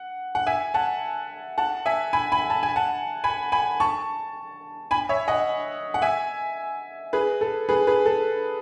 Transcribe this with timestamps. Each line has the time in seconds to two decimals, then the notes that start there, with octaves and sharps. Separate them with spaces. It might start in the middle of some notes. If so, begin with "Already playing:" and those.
Already playing: F#5
0.35 F#5
0.46 E5 G#5
0.74 F#5 A5
1.58 F#5 A5
1.86 E5 G#5
2.13 G#5 B5
2.32 G#5 B5
2.50 A5
2.63 G#5
2.76 F#5 A5
3.24 G#5 B5
3.52 G#5 B5
3.80 A5 C#6
4.91 G#5 B5
5.09 C#5 E5
5.28 D#5 F#5
5.94 F#5
6.02 E5 G#5
7.13 G#4 B4
7.41 A4
7.69 G#4 B4
7.87 G#4 B4
8.06 A4